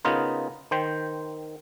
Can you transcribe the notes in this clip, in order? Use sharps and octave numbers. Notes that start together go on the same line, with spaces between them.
C#3 B3 D#4 F4 A#4
D#3 C5 G5